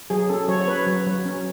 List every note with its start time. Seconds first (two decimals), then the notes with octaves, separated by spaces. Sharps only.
0.10 F#3 G#4
0.29 C#4 A4
0.48 F#3 C#5
0.61 C#5
0.68 C#4 B4
0.87 F#3
1.07 F#3
1.25 C#4